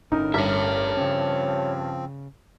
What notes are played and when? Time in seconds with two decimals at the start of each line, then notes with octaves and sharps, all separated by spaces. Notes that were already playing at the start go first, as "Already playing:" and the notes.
0.12 G1 A2 D3 C#4 D#4 A#4
0.34 G2 C#5 E5
0.97 C#3 F3 C4 C#4